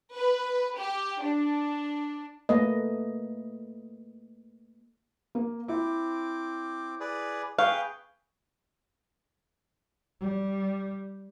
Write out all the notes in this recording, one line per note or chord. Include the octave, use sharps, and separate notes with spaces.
B4
G4
D4
A3 A#3 B4 D#5
A#3
C4 E4 D6
G#4 B4 D5
G#4 B4 F5 G5 C#6
G3